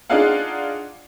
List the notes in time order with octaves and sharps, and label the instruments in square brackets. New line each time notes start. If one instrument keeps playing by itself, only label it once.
[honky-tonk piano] D4 D#4 F4 G#4 F5 F#5